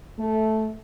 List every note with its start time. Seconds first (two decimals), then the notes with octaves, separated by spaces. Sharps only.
0.18 A3